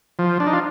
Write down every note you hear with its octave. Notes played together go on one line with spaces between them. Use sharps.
F3
D4
D#4
F4